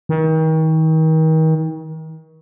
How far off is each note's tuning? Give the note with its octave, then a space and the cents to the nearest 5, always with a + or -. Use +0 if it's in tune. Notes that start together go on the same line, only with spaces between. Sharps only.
D#3 +35